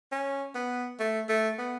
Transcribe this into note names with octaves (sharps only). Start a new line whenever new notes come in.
C#4
B3
A3
A3
B3